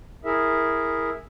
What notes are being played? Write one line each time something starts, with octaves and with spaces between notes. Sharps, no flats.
E4 G#4 A#4 E5